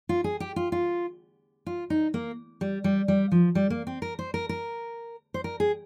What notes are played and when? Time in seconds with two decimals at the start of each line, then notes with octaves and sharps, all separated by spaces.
0.09 F4
0.24 G#4
0.40 G4
0.56 F4
0.72 F4
1.66 F4
1.90 D#4
2.14 A#3
2.61 G3
2.84 G3
3.08 G3
3.32 F3
3.55 G3
3.70 A#3
3.87 C4
4.02 A#4
4.19 C5
4.34 A#4
4.49 A#4
5.34 C5
5.44 A#4
5.60 G#4